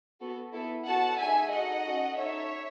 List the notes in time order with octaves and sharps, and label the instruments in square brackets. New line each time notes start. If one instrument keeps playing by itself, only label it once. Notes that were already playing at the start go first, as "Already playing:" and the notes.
[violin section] B3 F#4 A4
B3 E4 A4
B3 F#4 A4 F#5 A5
A3 D#4 G#4 E5 G#5
D#4 F#4 A4 D#5 F#5
C#4 F#4 A4
D#4 A4 C#5 E5